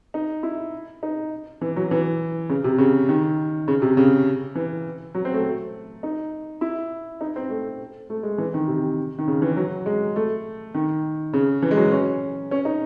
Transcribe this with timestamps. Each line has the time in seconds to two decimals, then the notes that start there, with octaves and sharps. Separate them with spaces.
0.14 D#4
0.43 E4
1.03 D#4
1.61 E3
1.76 F#3
1.91 E3
2.49 C#3
2.64 C3
2.78 C#3
3.09 D#3
3.68 C#3
3.82 C3
3.97 C#3
4.55 E3
5.15 F#3
5.25 C4
5.34 A3
6.03 D#4
6.61 E4
7.21 D#4
7.36 C4
7.50 A3
8.10 A3
8.23 G#3
8.38 E3
8.54 D#3
8.68 C3
9.19 D#3
9.28 C#3
9.42 E3
9.56 F#3
9.86 G#3
10.16 A3
10.75 D#3
11.33 C#3
11.62 E3
11.71 G#3
11.77 F#3
11.91 C#4
12.51 C#4
12.65 D#4